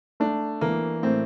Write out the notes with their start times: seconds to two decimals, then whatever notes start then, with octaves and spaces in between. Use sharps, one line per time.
0.20 A3 D4
0.61 E3 A#3
1.03 A2 C4